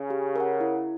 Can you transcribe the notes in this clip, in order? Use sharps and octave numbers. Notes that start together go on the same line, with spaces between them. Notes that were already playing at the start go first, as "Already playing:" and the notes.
Already playing: C#3
G4
A#4 C#5 F#5
E4